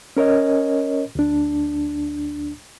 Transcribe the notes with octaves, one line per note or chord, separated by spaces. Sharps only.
C#4 A#4 C#5 D#5
D2 D4